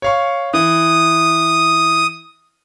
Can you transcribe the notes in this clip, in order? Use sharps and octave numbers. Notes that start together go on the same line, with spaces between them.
C#5 F5 C#6
E3 D#6